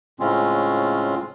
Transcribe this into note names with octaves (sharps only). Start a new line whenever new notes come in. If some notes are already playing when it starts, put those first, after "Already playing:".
A2 C#3 G#3 C4 C#4 F4